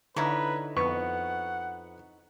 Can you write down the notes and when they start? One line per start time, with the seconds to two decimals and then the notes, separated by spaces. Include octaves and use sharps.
0.16 D3 D#4 E4 B4 C#5
0.77 F2 B3 F#5 C#6